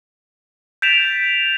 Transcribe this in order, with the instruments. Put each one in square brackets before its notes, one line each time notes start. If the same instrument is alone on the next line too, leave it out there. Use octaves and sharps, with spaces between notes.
[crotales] G6 A6 B6 D7 E7 F7